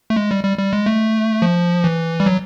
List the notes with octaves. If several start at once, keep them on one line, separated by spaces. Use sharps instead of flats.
A3
G#3
G3
G3
G3
G#3
A3
F3
E3
G3
F#3